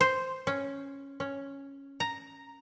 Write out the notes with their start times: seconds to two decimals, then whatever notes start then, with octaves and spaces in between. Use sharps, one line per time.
0.01 C5
0.47 C#4
1.20 C#4
2.00 A#5